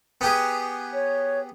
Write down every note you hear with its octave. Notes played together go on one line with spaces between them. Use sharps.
B3 G4 G#4
C#5